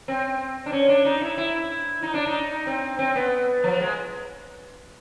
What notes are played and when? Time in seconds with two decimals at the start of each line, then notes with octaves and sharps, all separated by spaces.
0.08 C4
0.66 D4
0.72 C#4
0.89 D4
1.05 D#4
1.21 E4
1.38 E4
2.02 D#4
2.14 D4
2.27 D#4
2.67 C4
2.99 C4
3.16 B3
3.64 F3
3.80 G#3